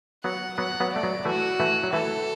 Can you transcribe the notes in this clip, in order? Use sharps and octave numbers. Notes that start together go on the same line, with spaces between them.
F#3 B3 F#5
F#3 B3 F#5
F#3 B3
A3 D5
F#3 B3
E3 A3 F#4
E3 A3
F#3
E3 A3 A4